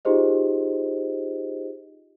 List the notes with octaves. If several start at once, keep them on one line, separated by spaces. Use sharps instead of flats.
D#4 F4 G4 G#4 C5 D#5